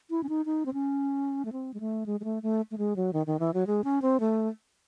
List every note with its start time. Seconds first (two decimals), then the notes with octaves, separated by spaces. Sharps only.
0.10 E4
0.23 C#4
0.29 D#4
0.46 D#4
0.66 C4
0.73 C#4
1.45 A3
1.52 C4
1.74 G#3
1.80 A3
2.06 G#3
2.20 G#3
2.24 A3
2.43 A3
2.71 A3
2.78 G#3
2.96 F#3
3.13 D#3
3.27 D#3
3.40 E3
3.54 F#3
3.67 G#3
3.84 C#4
4.02 C4
4.20 A3